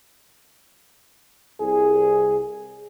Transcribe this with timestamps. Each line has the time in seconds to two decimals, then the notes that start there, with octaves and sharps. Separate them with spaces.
1.61 C2 G#4